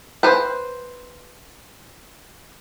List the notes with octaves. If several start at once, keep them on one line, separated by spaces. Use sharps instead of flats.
B4 C5